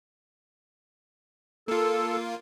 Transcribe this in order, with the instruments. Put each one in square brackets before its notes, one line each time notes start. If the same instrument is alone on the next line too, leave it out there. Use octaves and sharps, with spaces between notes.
[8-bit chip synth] A#3 F4 [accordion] A4